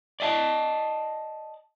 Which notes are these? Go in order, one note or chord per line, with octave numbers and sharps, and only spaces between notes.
D5 D#5 G5 A5